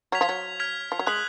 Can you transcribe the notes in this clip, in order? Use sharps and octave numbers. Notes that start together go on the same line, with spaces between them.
F#3 F6 G#6 B6 F7
F3
F#3
F6 G#6 B6 F7
F3
F#3
G#3 D#6 F#6 B6 F#7